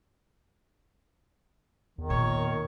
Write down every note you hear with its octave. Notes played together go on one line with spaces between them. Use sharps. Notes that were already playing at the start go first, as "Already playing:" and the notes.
E2 D#3
A#2 C#5